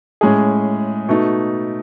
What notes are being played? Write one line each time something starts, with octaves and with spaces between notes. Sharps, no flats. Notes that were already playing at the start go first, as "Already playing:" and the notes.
A2 G#3 C#4 G#4
B2 A3 D#4